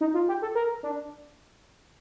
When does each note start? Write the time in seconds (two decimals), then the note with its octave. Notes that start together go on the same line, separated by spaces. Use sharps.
0.01 D#4
0.14 F4
0.28 G4
0.42 A4
0.55 A#4
0.83 D4